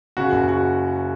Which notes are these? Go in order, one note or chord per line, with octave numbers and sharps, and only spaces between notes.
C#3 F#4
F#1
F#4